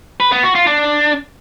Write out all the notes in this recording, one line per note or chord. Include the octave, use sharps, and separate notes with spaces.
B4
B3
F#4
F4
D4